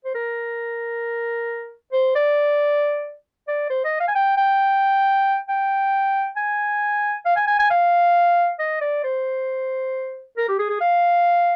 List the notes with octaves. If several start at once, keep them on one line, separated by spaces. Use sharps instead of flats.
C5
A#4
C5
D5
D5
C5
D#5
F5
G#5
G5
G5
G5
G#5
F5
G#5
G#5
G#5
F5
D#5
D5
C5
A#4
G4
G#4
G#4
F5